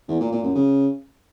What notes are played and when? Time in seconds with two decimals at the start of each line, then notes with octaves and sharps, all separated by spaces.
0.08 E2
0.20 A#2
0.32 A#2
0.43 F#2
0.55 C#3